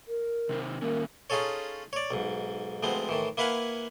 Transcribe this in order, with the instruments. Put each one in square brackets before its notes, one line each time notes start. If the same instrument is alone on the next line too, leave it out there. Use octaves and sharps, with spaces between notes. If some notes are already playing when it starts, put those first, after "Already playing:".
[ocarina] A#4
[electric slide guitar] C3 D#3 C5
[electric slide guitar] D#3 A#3 C#4 [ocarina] A#4
[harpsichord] C#4 D#4 F4 G#4 A4 C#5
C#5 D5
B1 G#2
D2 F3 G#3 B3 C4
A2 D#3 E3
A#3 E4 B4 F5 F#5 G#5